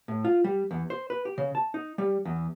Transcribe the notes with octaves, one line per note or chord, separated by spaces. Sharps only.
A2
F4
G3
E2
C5
B4
G4
C#3
A5
D#4
G3
E2